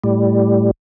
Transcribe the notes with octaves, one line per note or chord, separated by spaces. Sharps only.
A2 G3